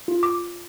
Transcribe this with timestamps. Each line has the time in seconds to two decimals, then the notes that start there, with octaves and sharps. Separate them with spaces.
0.08 F4
0.23 D6